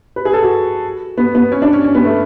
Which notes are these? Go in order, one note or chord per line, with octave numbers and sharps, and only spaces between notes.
B4
G#4
A4
F#4
B3
B3
C#4
D4
C#4
C#4
B3
A3